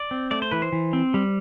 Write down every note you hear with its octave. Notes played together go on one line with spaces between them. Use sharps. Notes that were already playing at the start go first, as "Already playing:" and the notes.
Already playing: D5
C4
A3 D5
C5
E3 B4
C5
E3
C4
G3